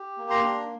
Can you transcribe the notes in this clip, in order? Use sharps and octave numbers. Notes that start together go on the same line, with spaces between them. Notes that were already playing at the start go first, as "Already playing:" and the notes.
Already playing: G4
A#3
A#5 C6
D4